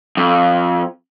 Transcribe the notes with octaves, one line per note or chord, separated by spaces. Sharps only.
F2